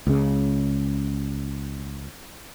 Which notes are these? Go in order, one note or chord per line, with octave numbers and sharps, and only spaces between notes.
C#2 C#3